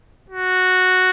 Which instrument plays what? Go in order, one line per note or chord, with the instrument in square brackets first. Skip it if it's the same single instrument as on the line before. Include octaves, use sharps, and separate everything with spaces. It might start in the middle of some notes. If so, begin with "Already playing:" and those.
[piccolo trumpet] F#4